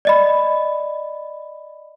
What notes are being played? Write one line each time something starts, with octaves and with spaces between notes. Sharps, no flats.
D5 D#5 B5